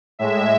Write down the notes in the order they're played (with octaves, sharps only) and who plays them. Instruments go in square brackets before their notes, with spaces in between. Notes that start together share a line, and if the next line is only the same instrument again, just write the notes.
[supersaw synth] A2 G#3 E5